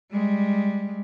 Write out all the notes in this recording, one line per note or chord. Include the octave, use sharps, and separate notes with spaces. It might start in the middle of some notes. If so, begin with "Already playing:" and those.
G3 G#3